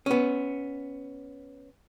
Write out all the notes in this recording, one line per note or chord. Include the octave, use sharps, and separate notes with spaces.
B3 C#4